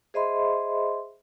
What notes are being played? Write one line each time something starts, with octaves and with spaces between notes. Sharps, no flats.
G#4 C5 D#5 E5 B5 C6